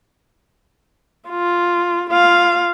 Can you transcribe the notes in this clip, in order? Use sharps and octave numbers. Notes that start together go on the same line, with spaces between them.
F4
F4 F5